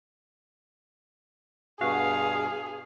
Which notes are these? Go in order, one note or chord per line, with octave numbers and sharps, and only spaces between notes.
G2 B2 F#4 G#4 F5